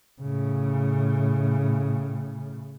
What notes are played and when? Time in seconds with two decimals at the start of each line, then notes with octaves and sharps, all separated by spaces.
0.22 A2 C#3